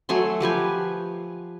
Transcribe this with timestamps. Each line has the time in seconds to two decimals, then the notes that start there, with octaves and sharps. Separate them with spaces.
0.09 F#3 A3 G#5 C6
0.40 F3 G4 B4 G#5